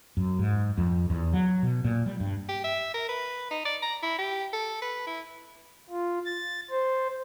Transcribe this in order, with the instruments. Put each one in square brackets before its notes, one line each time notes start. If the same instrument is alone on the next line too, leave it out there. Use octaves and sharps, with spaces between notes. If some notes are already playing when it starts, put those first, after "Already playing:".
[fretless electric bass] F#2
G#2
F2
E2
F#3
B2
A#2
G3
G2
[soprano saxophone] G4
E5
A#4
B4
D#4
D5
A#5
E4
G4
A4
B4
E4
[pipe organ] F4
A6
C5